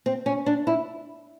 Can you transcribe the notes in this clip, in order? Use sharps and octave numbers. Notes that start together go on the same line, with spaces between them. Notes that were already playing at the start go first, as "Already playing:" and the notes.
C4
C#4
D4
E4